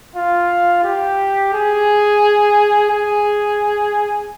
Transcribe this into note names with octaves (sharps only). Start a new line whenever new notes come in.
F4
G4
G#4
G#4